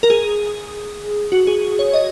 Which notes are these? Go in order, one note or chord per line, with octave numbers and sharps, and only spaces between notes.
A#4
G#4
F#4
G#4
C#5
D#5